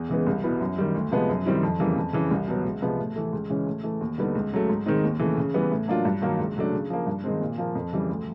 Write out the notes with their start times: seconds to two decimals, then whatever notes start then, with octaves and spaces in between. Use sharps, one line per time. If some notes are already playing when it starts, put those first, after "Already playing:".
Already playing: E2
0.09 C#3 E3 G#3 B3
0.27 C2
0.43 B2 G3 B3 E4
0.60 F#2
0.78 D#3 G3
0.94 D2
1.12 C3 F3 G#3 B3
1.29 F#2
1.46 D#3 G3 C4 E4
1.63 F2
1.80 C#3 E3 G3 A#3
1.96 F2
2.13 C#3 E3
2.31 C2
2.48 B2 F#3 B3
2.65 C#2
2.82 C3 F3 G#3 B3
2.98 A2
3.16 E3 A3
3.33 C#2
3.50 C#3 E3 G#3 C#4
3.67 A2
3.83 E3 A3
4.01 D#2
4.18 D3 G3 B3 D#4
4.35 C#2
4.52 C#3 F#3 A3
4.69 G#2
4.86 D#3 G#3 C4 D#4
5.04 D#2
5.19 C#3 E3 A3
5.37 C#3
5.54 E3 G3 B3
5.72 A2
5.88 F#3 A#3 D4 F4
6.05 G2
6.22 D#3 F#3 A#3
6.40 C#2
6.57 C#3 F#3 A3 D4
6.73 C#3
6.90 F3 A#3
7.07 G2
7.24 D#3 G#3 C4
7.41 A#2
7.58 F3 A#3
7.75 F2
7.92 C#3 E3 G3
8.09 D2